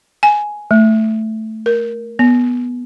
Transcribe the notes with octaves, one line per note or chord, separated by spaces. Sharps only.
G#5
A3
A#4
B3